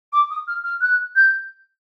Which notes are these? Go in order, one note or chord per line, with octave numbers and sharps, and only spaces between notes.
D6
D#6
F6
F6
F#6
G6